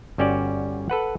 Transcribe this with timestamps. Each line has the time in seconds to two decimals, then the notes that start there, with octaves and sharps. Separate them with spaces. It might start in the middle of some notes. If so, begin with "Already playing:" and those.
0.18 G1 G3 C#4 F#4 D5
0.90 A4 B4 F#5